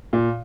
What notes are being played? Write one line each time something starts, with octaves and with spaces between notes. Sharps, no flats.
A#2